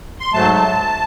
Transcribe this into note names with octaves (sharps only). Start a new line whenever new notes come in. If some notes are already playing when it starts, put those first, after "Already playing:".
C6
G#2 F#3 A3 A5
A5